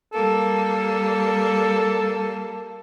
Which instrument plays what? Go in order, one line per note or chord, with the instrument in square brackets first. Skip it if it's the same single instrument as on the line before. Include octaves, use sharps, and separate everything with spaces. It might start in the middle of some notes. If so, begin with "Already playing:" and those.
[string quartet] G3 A#3 [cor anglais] A4